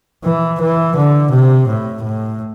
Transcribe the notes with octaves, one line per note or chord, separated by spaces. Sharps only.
E3
E3
D3
C3
A2
A2